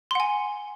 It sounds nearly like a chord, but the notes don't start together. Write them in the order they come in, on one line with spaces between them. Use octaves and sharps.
C6 F#5 G#5